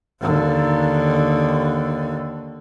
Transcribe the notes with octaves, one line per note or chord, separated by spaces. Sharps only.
D#2 D3